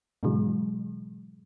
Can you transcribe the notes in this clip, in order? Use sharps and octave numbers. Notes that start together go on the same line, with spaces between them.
G#2 B2 D3 E3 F#3 G#3